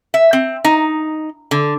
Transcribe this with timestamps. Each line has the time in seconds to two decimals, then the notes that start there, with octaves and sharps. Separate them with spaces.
0.14 E5
0.33 C4
0.65 D#4
1.51 D3